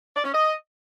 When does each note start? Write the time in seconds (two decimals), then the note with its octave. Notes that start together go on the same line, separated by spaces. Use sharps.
0.15 D5
0.24 C#4
0.34 D#5